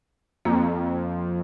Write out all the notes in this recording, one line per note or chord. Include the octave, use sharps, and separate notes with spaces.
F2 A#3